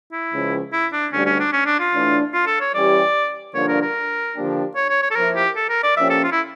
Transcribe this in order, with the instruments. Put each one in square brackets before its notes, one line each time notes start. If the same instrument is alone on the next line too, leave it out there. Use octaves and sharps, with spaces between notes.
[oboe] E4
[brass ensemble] C#2 C#3 F3
[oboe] E4
D4
[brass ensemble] D2 D3 G3 [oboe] C#4
[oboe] C#4
D4
C#4
D4
F4
[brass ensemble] A2 E3 A3 D4
[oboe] F4
A4
C#5
[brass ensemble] E3 G3 C#4 G4 [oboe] D5
[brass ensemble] G2 D3 F3 A#3 D4 [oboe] C#5
[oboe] A#4
A#4
[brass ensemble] D3 F3 A#3 D4 G4
[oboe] C#5
C#5
C#5
A4
[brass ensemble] F3 A#3 E4 [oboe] A#4
[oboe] G4
A4
A#4
D5
[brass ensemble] A#2 F3 A#3 C#4 G4 [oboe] E5
[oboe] A4
F4
E4